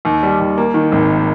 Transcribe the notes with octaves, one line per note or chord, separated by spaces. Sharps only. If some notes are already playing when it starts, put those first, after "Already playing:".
D#2
G3
D#2
A#3
D#3
G#1